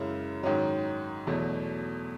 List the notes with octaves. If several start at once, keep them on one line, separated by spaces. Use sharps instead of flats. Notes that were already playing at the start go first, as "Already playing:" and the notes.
Already playing: F#2 C#3 G#3 E4
G#2 D#3 F#3 C#4
E2 B2 F#3 A3